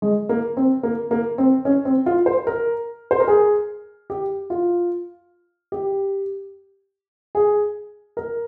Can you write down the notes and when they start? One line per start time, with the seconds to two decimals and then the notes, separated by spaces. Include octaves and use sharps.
0.02 G#3
0.29 A#3
0.57 C4
0.83 A#3
1.11 A#3
1.38 C4
1.65 C#4
1.85 C4
2.06 F4
2.26 C5
2.47 A#4
3.11 C5
3.20 A#4
3.28 G#4
4.10 G4
4.50 F4
5.72 G4
7.35 G#4
8.17 A#4